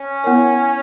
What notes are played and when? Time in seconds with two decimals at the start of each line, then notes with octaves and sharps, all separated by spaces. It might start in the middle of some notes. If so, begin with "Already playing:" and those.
Already playing: C#4
0.24 B3 E4 A#4 C#5